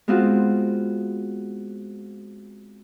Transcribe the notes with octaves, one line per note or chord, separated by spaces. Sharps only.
G#3 B3 C4 F4 F#4